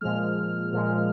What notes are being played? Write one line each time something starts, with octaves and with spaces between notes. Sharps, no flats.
A#2 F3 G#3 F6
A#2 F3 G#3